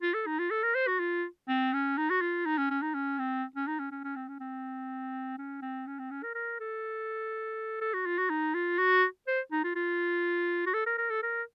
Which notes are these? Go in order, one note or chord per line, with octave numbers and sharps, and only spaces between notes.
F4
A4
D#4
F4
A4
A#4
C5
F#4
F4
C4
C#4
D#4
F#4
F4
D#4
C#4
C#4
D#4
C#4
C4
C#4
D#4
C#4
C#4
C#4
C4
C#4
C4
C#4
C4
C#4
C4
C#4
A#4
A#4
A4
A4
F#4
F4
F#4
D#4
F4
F#4
C5
D#4
F4
F4
F#4
A4
A#4
A#4
A4
A#4